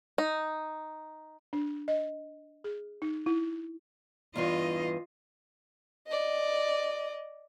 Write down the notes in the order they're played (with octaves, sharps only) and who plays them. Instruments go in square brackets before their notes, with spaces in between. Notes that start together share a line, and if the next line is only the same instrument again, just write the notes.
[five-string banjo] D#4
[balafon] D4
D#5
G#4
D#4
E4
[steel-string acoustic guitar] E2 G2 E3 [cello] F4 D#5
[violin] D5 D#5